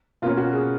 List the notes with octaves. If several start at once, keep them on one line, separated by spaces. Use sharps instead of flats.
B2 A#3 C#4 F4
F#4
G#4